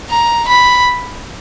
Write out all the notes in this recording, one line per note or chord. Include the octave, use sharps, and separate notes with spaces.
A#5
B5